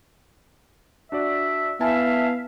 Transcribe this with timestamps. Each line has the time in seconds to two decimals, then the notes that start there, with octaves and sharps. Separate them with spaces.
1.12 D4 F#4 D5 E5
1.81 B3 E4 E5 F5 G#5 A5